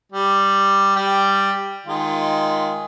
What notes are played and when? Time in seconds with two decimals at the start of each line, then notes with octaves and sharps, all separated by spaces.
0.12 G3
0.96 G3 G5
1.86 D#3 G#3 F4